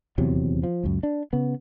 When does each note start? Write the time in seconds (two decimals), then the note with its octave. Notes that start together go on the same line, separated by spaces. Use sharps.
0.18 D#1 E2 C3 F#3
0.63 F3
0.84 C#2 F#2
1.03 D4
1.33 C#3 B3